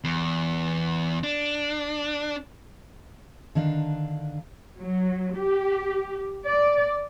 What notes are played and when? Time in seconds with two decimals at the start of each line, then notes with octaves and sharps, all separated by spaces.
0.04 E2
1.24 D4
3.55 D3 D#3 D4 F5
4.79 F#3
5.37 G4
6.46 D5